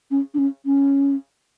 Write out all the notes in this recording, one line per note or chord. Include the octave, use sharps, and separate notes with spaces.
C#4
D4
C#4
C#4